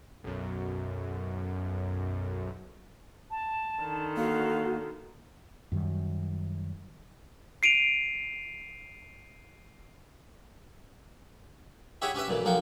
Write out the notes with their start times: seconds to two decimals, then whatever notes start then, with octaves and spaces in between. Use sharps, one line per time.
0.24 B1 F#2
3.31 A5
3.81 D3 D#3
4.17 A#3 F#4 A4 F5
5.72 F#2 D#3 G3
7.63 C7 D7 D#7 F7
12.02 E4 G4 G#4 C#5 E5 F#5
12.15 C#4 G4 B4 E5
12.28 B1 A#2 E3
12.45 B1 F3 A#3 F#5 G5